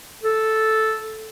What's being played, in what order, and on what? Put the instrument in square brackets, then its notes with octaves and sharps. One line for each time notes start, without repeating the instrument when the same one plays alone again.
[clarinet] A4